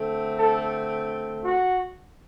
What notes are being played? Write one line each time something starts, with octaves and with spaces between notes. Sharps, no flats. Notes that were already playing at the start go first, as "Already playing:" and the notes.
Already playing: D3 A3 C4
A4
F#4